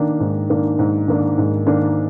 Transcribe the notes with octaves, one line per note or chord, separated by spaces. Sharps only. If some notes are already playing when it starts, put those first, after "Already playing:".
Already playing: D#3 A#3 D4
G#2
D#3 A#3 D4
G#2
D#3 A#3 D4
G#2
D#3 A#3 D4